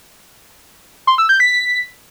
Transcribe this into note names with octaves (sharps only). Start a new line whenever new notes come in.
C6
E6
G6
B6